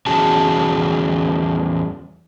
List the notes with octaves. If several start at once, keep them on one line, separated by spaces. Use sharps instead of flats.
E2 C#4 F#4 G#4 A5